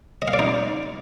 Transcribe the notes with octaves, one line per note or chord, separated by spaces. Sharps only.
D#5
F5
D5
D#4